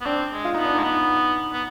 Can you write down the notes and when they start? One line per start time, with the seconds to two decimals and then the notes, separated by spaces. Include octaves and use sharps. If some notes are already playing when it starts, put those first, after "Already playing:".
0.01 B3
0.06 C4 D4
0.32 G#3
0.45 F4
0.54 B3 D#4
0.65 D4
0.75 G#3 D#4
0.83 B3
1.53 B3